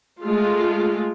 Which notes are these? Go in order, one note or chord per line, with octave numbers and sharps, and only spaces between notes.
G#3 A3 F4